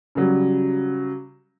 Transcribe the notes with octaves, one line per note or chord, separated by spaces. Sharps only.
C#3 F#3 G3